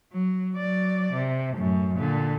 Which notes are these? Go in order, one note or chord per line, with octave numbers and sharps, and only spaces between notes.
F#3
F#3 D5
C3
F#2 A2
A#2 D3